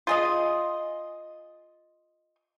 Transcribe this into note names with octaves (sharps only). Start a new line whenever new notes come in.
F4 G#4 D#5